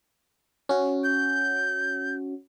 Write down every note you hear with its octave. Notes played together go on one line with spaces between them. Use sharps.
C#4 F#4
G6